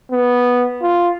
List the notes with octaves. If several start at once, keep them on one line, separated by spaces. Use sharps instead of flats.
B3
F4